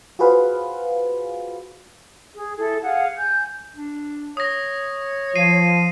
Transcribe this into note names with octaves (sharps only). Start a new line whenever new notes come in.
F4 F#4 G#4 B4 C5 F5
G#4
E4 G#4 A4
G#4 F5 F#5
G#5 G6
D4
C#5 D#6 A#6
F3 C7 D#7